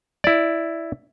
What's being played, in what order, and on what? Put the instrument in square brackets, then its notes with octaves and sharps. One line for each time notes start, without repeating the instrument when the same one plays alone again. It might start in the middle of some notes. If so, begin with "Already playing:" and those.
[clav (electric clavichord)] E4 D5